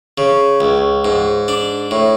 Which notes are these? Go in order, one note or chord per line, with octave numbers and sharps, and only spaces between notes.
C#3
C#2
G#2
D4
A2